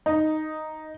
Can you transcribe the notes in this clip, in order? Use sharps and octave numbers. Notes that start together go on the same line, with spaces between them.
D#4